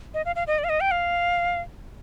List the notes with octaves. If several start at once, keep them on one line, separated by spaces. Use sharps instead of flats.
D#5
F5
F5
D#5
D5
F5
D#5
G5
F5